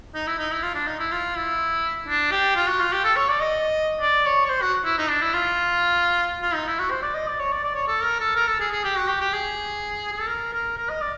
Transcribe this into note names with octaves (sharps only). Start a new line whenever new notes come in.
D#4
E4
D#4
E4
F4
D4
D#4
E4
F4
E4
D4
G4
F4
F#4
F4
G4
A4
C#5
D5
D#5
D5
C#5
C#5
C5
F#4
E4
D#4
D4
E4
F4
F4
D#4
E4
F#4
C5
D5
D#5
D5
C#5
D5
D5
C#5
A4
A#4
A4
A#4
A4
G#4
G#4
G4
F#4
G4
G4
G#4
G#4
A4
A#4
A#4
A#4
D#5
D5